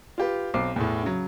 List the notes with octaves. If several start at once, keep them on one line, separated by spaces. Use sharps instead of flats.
F4 G4 B4
B1 C4 D6 C7
E2 A2
C#3 F#3